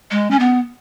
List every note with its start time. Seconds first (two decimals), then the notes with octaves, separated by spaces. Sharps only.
0.11 G#3
0.31 C#4
0.39 B3